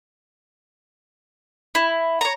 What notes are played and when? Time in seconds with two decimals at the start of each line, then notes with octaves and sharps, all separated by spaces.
1.75 E4
2.21 C#5 A#5